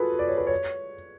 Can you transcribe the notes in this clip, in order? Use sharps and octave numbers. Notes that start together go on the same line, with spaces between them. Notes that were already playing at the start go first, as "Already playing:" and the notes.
Already playing: F4 F#4 G#4 A4 B4
D5
C#5
B4
C#5